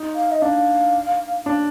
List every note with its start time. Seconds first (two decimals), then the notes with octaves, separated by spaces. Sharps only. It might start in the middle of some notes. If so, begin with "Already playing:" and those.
Already playing: D#4
0.15 F5
0.31 D#5
0.42 D4 F5
1.46 D4